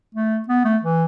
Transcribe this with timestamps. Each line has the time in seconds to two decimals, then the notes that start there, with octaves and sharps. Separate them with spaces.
0.15 A3
0.48 B3
0.65 A3
0.83 E3